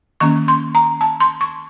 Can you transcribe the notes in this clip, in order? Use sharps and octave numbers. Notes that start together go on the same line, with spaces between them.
D#3 A#3 C#4 C#6
C6
A#5
A5
C6
C#6